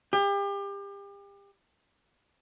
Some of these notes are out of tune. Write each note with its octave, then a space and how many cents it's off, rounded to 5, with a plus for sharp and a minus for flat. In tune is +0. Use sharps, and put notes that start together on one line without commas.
G4 +35